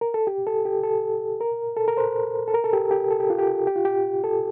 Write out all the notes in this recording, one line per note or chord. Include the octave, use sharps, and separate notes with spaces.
A#4
A4
G4
A4
G4
A4
A#4
A4
A#4
C5
A4
A#4
A4
G4
G4
A4
G4
F4
G4
G4
F4
G4
A4